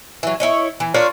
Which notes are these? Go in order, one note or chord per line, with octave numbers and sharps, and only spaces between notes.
E3 F#3
E4 C#5 D#5
E3
D4 F4 A#4 C#5